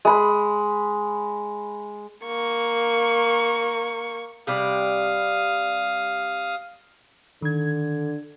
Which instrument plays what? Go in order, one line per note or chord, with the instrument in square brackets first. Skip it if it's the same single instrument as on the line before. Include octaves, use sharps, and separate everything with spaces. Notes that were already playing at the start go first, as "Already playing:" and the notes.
[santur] G#3 B5
[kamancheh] A#3 C#6
[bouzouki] C3 G3 D5 [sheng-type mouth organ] F5 D#6
[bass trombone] D3 [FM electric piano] D#3 G#6